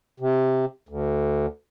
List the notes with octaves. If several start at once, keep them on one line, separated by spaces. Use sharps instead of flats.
C3
D2